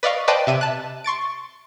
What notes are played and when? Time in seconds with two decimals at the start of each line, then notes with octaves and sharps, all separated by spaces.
0.03 B4 D5 D#5 F5 C#6
0.28 B4 C5 D5 D#5 G5 A5
0.47 C3 E5 D#7
0.61 A5 F#6
1.04 C6 C#6 A6 D7